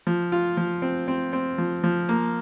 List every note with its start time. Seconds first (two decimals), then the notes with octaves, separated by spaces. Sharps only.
0.07 F3
0.32 F4
0.57 F3
0.82 C4
1.08 C4
1.33 C4
1.58 F3
1.84 F3
2.09 A#3